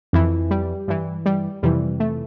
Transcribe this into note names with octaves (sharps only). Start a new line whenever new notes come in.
F2 E3
G3
G2 E3
G3
F2 C3 E3 G3
A3